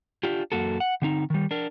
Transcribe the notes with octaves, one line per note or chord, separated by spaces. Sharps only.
D4 F4 G4
F#2 A#3 F#4 A4
F#5
D3 C4 D#4
D#3 G3
D4 A#4